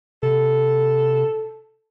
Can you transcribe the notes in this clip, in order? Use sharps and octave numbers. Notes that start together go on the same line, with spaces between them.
C3 A4